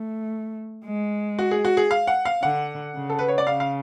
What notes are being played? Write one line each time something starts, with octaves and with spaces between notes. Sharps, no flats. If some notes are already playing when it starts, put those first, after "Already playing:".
Already playing: A3
G#3
F#4
G#4
F#4
G#4
F5
F#5
F5
D3 F#5
C#3
A4
B4
C#5
D5
C#3 F5
F5